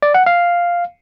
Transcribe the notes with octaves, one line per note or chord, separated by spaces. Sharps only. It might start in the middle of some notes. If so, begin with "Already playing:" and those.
D5
F#5
F5